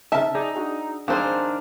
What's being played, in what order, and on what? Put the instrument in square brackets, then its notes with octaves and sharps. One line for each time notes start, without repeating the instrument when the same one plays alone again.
[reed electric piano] C#3 C4 D#4 [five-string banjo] E5 A5 [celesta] E6 F6
[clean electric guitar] D#4 [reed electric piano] G#4 D5
[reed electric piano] D4 F#4 G#4
[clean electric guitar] D#3 D4 [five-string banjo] C4 C5 [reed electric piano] G#4 G#5 [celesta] F5